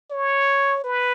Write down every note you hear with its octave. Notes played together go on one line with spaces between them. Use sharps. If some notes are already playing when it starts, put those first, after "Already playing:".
C#5
B4